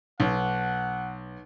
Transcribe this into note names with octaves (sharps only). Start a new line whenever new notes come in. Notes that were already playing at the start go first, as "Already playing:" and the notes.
B1 F#5